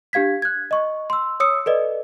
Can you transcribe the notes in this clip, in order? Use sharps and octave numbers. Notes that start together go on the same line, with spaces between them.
D4 G4 F5 G#6 B6
F#6 G#6
D#5 C#6
C6 E6
C#5 D#6 E6 C#7
A4 B4 D5 D#5